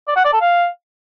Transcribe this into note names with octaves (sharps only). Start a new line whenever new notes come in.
D5
F#5
D5
A4
F5